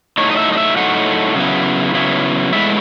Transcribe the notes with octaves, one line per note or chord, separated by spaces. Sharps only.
A2 F#3 A3 D#4 C#5
D#5
E5
D#5
E5
A2 F#3 A3 D#4 F#5
C#3 F#3 B3 E4
C#3 F#3 B3 E4
A2 G#3 B3 E4 E5